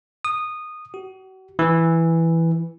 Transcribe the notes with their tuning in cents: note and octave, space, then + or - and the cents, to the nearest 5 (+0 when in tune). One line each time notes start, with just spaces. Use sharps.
D#6 -15
F#4 +40
E3 +0